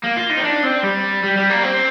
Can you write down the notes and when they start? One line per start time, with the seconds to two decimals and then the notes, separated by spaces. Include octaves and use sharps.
0.04 A#3
0.17 F4
0.30 D#4
0.37 C4
0.44 D4
0.64 C4
0.83 G3
1.23 G3
1.37 G3
1.50 A#3
1.63 C4